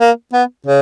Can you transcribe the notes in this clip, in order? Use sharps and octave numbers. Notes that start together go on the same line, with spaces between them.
A#3
B3
C#3